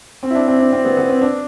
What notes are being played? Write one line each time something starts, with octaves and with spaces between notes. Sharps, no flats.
C4
E4
D4
C4
D4
C4
B3
B3
C4
D4